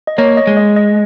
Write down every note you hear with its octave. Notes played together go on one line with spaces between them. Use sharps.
D#5
A#3 C#5
D#5
G#3
D#5
D#5